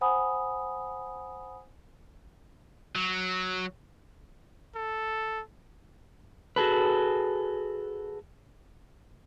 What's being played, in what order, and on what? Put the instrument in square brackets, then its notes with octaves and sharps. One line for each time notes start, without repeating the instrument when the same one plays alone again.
[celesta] C5 F#5 G#5 B5 D#6
[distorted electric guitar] F#3
[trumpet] A4
[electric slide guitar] F#4 G#4 A4 B4